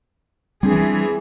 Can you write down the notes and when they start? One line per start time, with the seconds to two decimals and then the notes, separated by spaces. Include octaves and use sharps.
0.63 E3 G3 C4 D4 G#4